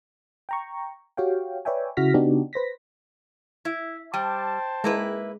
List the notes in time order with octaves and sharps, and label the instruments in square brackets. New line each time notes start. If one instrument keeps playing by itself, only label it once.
[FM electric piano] G5 A#5 C#6
F#4 G4 C#5 F5 G5
B4 C#5 D5 E5 G5 G#5
C#3 E4 F#4 F6 A#6 B6
C#3 B3 D4 D#4 F#4 G4
B4 C5 A#6 B6
[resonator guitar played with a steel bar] E4 [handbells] E5
[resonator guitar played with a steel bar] G3 [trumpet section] C5 A5 [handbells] G5
[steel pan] G#3 [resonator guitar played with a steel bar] A#3 E4 B4